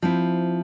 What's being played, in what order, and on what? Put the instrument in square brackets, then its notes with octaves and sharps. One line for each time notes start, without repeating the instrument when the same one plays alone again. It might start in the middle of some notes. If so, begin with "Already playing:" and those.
[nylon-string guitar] F3 C4 E4